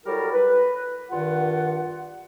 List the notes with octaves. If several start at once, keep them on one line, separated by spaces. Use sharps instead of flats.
F#3 G3 E4 A4 A#4
B4
G2 D#3 F4 F#5